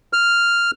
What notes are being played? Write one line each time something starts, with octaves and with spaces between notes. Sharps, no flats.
F6